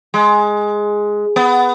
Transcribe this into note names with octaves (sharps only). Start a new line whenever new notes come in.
G#3
B3